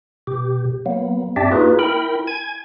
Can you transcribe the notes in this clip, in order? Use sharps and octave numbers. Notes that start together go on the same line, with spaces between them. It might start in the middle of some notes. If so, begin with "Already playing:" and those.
B2 G4
F#3 A#3 B3
G2 C4 D4 G4 D5 E5
A#3 D#4 F4 F#4 G#4 B4
E4 A#4 G5 B5
G#5 G#6